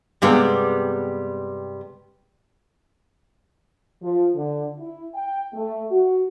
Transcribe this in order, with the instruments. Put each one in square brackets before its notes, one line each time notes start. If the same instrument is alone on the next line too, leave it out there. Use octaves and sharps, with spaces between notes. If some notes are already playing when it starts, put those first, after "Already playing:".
[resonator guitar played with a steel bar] G2 C3 G3 [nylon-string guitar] G#3 B3 G#4
[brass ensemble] F3
D3
E4
G5
A3
F#4